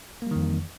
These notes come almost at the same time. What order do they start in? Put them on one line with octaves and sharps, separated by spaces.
A#3 G3 D#3 F2 E3